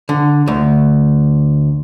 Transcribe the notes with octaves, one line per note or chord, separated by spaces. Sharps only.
D3
D2